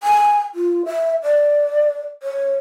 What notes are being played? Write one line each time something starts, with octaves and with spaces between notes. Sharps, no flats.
G#5
F4
E5
D5
C#5